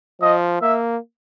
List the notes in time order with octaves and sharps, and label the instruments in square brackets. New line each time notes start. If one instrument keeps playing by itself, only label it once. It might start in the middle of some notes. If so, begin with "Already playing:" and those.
[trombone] F3 [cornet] D#5
[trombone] A#3 [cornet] E5